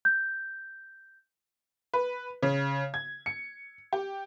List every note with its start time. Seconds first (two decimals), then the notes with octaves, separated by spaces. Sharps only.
0.05 G6
1.94 B4
2.43 C#3
2.94 G#6
3.26 C#7
3.93 G4